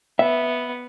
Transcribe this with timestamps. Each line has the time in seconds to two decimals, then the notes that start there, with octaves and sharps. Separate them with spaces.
0.19 B3 E5